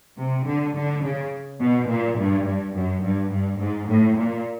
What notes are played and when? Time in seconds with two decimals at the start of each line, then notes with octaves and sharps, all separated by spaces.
0.18 C3
0.45 D3
0.75 D3
1.03 C#3
1.60 B2
1.88 A#2
2.18 G2
2.45 G2
2.74 F#2
3.02 G2
3.31 G2
3.60 G#2
3.88 A2
4.17 A#2